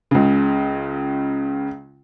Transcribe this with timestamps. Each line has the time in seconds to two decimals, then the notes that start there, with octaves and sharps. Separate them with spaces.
0.11 C#2 C#3